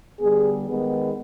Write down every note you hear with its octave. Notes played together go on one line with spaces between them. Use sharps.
D3 G3 B3 G#4
D#3 G#3 B3